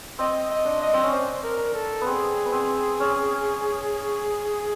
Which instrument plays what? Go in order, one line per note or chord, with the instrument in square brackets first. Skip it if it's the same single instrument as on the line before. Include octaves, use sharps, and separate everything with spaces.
[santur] C4 [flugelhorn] D#5
[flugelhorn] D#5
[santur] D4
[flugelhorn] D#5
[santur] C4
C#4
[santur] D4 [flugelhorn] C5
[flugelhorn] A#4
A4
[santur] B3
[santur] C4 [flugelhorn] G#4
[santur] B3
C4
C#4